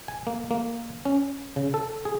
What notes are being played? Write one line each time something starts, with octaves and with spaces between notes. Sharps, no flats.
G#5
A#3
A#3
C#4
C#3
A4
G#4